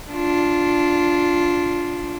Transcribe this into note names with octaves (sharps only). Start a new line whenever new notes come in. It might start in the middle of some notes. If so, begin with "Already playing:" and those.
D4 F4